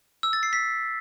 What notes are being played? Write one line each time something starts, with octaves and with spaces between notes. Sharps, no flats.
E6
A6
C7
B6